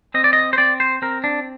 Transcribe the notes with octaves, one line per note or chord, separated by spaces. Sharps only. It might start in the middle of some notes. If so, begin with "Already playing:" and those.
C4 D#5
D5
D#5
C5
C4 D5
C5
C4 A#4
D4